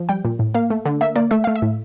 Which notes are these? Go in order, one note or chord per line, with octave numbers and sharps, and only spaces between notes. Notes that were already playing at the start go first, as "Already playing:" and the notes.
Already playing: F3
G3 G5
A#2
A2
A#3 F5
A3
D3
A#3 E5
A#3 D5
A3 E5
A3 F5
E5
A2